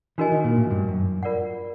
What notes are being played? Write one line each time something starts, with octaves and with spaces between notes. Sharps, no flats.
E3 D4 F#4 A#4 D#5 G#5
D#3
A#2
A2
G2
F#2
F4 A#4 D5 F#5